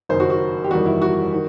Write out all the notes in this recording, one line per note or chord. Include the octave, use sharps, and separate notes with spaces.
F#1 F#2 D#3 C5
F#4
F#4
G4
F#1 E2 D#3 G3 F#4
E4
F#4
D#3